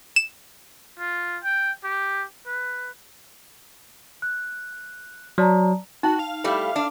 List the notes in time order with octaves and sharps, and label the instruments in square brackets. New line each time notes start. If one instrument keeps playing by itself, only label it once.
[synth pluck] E7
[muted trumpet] F4
G5
G4
B4
[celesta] F#6
[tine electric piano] F#3 [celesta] D5 A5 A#5
[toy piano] D#4 G5 [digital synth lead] F#4
[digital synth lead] F5
[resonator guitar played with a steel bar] G3 A3 E4
D4